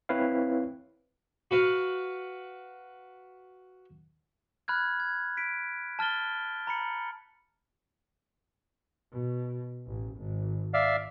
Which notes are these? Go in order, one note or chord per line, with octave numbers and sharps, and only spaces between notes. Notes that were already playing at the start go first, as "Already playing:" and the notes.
C4 E4 B4 C#5 F5
F#4 B4 F5
B5 F6 F#6 G#6
G#6
B6 D7
A5 F6 A6 G7
A#5 B5 C#7
B2
A1
G#1
D5 E5 F5